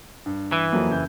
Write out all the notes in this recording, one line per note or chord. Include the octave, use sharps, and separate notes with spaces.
G2
E3
F2 F#3 A#3
F#1 G6